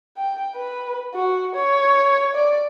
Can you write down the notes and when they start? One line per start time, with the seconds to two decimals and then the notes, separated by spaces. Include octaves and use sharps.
0.17 G5
0.56 B4
1.14 F#4
1.55 C#5
2.35 D5